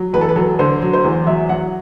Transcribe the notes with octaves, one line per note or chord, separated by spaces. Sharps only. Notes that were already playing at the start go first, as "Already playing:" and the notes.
Already playing: F#3
E2 B4
A4
B4
F#3 A4
D3 C5
F#3
C5
E2
F#3 E5
F#3 F#5